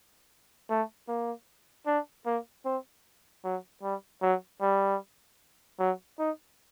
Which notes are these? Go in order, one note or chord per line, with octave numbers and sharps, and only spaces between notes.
A3
A#3
D4
A#3
C4
F#3
G3
F#3
G3
F#3
D#4